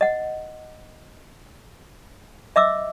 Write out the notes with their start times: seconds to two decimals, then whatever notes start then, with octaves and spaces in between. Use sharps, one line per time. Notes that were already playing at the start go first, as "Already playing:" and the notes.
0.01 D#5 F#5
2.56 D#5 E5 D6 E6